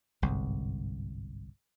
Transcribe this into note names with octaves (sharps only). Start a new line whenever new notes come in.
G1 C2 G#2